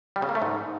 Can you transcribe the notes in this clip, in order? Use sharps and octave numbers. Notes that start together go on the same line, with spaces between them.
G3
C#3
A#3
A3
G#2